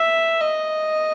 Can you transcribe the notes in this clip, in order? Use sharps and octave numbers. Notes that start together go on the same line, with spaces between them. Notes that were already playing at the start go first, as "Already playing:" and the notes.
Already playing: E5
D#5